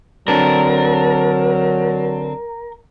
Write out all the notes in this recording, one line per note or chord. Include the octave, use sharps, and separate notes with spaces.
D3 F#3 C4 D4 A#4